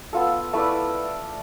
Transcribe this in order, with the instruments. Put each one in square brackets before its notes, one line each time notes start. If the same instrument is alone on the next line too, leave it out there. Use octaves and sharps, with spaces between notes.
[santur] B3 F4 A4
A3 E4 B4 D5